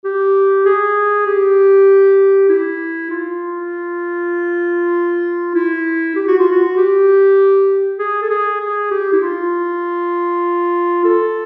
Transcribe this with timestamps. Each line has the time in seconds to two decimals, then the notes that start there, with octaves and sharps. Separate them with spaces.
0.05 G4
0.66 G#4
1.26 G4
2.49 E4
3.10 F4
5.55 E4
6.16 G4
6.28 F#4
6.39 F4
6.51 F#4
6.77 G4
7.99 G#4
8.22 A4
8.30 G#4
8.60 G#4
8.91 G4
9.13 E4
9.22 F4
11.05 A4